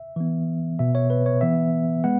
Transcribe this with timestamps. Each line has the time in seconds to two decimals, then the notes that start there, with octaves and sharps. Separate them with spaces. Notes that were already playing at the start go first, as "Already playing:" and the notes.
Already playing: E5
0.16 E3 B3
0.79 B2 B3 E5
0.95 C#5
1.10 B4
1.26 C#5
1.41 E3 B3 E5
2.04 G#3 B3 F#5